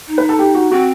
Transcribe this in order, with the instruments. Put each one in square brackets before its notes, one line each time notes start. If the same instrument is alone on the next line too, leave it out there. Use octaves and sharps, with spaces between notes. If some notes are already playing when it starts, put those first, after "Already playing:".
[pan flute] D#4
[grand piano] B4
A4
G4
F#4
[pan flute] C4 [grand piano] F#4